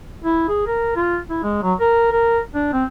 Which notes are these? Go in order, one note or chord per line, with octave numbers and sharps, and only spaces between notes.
E4
G#4
A#4
F4
E4
G#3
F#3
A#4
A#4
D4
C4